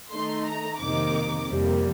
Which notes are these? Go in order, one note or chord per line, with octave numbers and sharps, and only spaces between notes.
D#3 A3 D#4 C6
A#5
F2 C3 D#3 A#3 D#4 D6
F2 C3 G3 A#3